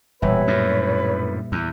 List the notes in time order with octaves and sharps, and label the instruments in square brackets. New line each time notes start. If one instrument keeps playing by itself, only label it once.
[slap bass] E1 [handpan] A#2 G3 E5 [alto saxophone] B4 [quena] C#5
[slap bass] F#2 A2
E2